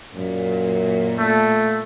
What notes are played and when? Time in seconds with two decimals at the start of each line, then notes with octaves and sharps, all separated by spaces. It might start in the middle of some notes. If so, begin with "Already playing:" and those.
0.14 F#2 A#2
1.18 A3